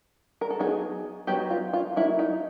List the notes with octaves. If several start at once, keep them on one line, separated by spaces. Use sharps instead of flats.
A#4
A4
F#3 B3 D#4 G#4
F#3 B3 D#4 G4
F4
F4
F#3 A#3 D#4 E4
D#4